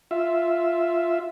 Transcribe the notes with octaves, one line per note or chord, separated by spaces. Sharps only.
F4 E5